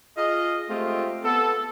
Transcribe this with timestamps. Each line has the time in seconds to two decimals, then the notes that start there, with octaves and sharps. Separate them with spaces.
0.17 F4 G#4 D#5
0.69 G#3 A3 C4 F4 G4
1.24 B3 A4